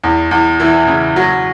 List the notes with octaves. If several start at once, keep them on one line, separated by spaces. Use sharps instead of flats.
E2
E2
E3
C#3
F#3